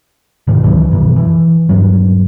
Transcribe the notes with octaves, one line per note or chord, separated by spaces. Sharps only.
G#2 B2 D#3
C#2 D#3 E3 F#3
F#2 B2 D#3 E3
E3
D#1 G2 F#3